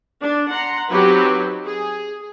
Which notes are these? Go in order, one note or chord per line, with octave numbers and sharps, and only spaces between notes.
D4
F#5 A#5 C6
F#3 C4 D#4 F#4 G4 B4
G#4